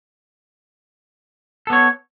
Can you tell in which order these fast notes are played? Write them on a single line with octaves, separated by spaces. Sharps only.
A4 B3 C#5